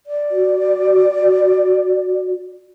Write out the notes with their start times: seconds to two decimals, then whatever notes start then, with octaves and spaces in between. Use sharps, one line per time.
0.07 D5
0.31 F#4